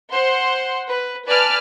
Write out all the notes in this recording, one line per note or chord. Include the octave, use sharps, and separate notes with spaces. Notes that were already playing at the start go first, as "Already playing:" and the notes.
C5 F#5 C6
B4
B4 D5 G#5 A5 F6